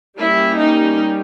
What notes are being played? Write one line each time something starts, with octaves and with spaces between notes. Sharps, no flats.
G3 A#3 C#4 E4
D#4